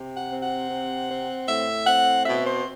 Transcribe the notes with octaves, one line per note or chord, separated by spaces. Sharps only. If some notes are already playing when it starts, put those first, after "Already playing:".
Already playing: C3
F#5
C4
F#5
C3
C4
A2 E5
C4 F#5
B2 E5
C5